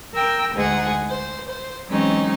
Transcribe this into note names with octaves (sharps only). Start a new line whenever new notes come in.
A#4 G5 E6
D2 G#2 G#3 G#4 F#5
C5
C5
E3 F#3 G#3 C4 C#4 D#4